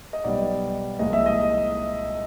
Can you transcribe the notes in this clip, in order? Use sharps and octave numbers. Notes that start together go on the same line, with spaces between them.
D#5
B1 B2 G3 D5
C2 A#2 F3 G#3 D#5
E5
D#5